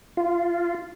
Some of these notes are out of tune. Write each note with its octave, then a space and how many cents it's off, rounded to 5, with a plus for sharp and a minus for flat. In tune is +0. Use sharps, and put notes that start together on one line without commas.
F4 -15